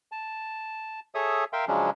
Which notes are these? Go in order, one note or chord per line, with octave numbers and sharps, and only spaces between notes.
A5
G#4 A4 C#5 E5 D#6
A#4 E5 F5 G5 C6
C#3 F3 F#3 G#3 C#4 D4